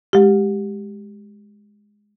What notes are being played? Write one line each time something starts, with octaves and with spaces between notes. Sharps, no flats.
G#3 G4